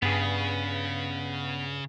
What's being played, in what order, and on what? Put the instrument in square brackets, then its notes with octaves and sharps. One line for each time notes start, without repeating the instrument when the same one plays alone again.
[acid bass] G2 [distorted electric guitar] C#3 [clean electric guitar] B3 G#4